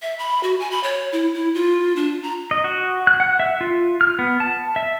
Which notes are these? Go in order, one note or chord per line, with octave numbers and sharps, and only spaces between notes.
E5
B5
F#4
G#5
B5
C#5
E4
E4
F4
D4
A#5
D#5
F#4
F#6
F#5
E5
F4
F6
B3
A5
E5